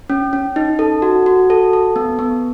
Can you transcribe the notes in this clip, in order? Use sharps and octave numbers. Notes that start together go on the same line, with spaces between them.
C#4
C#4
D#4
A4
F#4
F#4
A4
A4
B3
B3